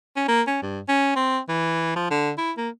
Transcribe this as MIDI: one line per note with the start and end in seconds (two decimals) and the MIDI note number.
0.16 0.25 61
0.28 0.42 58
0.47 0.59 61
0.62 0.80 43
0.88 1.13 61
1.16 1.39 60
1.49 1.94 52
1.96 2.06 53
2.11 2.31 50
2.38 2.52 64
2.57 2.69 58